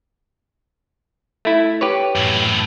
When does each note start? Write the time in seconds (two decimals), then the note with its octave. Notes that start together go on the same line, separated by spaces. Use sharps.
1.45 A3 E4
1.81 G4 B4 C#5
2.16 F#2 A2